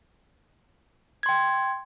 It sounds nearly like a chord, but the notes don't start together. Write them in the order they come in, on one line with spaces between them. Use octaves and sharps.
G#6 C6 G5